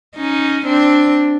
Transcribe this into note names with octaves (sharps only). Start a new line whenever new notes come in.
C#4 D#4
C4 D4